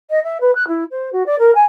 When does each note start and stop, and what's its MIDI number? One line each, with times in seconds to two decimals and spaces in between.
0.10 0.22 75
0.24 0.38 76
0.41 0.53 71
0.55 0.66 90
0.67 0.84 64
0.91 1.09 72
1.13 1.26 66
1.26 1.35 74
1.39 1.53 70
1.55 1.64 80